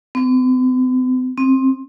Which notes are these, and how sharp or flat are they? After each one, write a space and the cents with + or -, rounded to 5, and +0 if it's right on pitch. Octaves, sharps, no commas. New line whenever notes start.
C4 -45
C4 +15